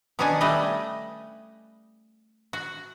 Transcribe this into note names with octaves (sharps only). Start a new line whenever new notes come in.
B2 D#3 C#4 D4 F#5 G#5
G3 A3 B4 D#5
F#4